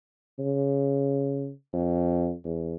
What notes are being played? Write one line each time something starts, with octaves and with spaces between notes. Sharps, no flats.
C#3
F2
E2